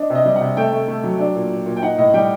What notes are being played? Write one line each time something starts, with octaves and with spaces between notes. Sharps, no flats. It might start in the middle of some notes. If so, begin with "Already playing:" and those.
Already playing: D4 D#5
C3
D#5
G3
C3 F#5
A3 G5
A3
A3
F#3
D4
A#2
A#2
A#2
G5
D#4 F#5
A2 D#5
G3 G5